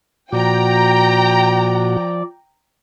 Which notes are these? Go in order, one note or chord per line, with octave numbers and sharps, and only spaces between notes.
A#2 F3 F#4 D5 G5 A#5